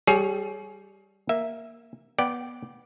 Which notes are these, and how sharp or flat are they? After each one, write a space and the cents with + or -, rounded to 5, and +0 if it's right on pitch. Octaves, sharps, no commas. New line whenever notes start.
G3 -5 G#4 +30 C#5 +0
A#3 +0 E5 +0
B3 -15 D5 +0 G5 -20